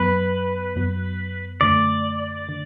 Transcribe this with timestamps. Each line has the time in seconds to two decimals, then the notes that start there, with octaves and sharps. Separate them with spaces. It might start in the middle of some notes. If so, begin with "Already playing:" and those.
Already playing: F#2 F#3 B3 B4
0.76 F#2 F#3 B3
1.61 F#2 D3 A3 D5
2.49 D3